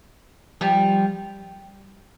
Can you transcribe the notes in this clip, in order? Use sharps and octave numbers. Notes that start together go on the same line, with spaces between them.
F3 G3